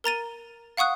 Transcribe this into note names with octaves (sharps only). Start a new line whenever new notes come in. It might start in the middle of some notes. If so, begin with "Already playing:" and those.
A#4 A#5 A6 D#7
F5 F#5 C#6 D#6 F#6